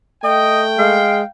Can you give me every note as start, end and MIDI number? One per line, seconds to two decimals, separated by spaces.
0.24 0.99 57
0.24 0.62 75
0.24 1.27 79
0.78 1.22 56
0.78 1.25 77